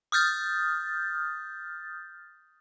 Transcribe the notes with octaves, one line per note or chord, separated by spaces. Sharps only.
D#6 F6 G6 A6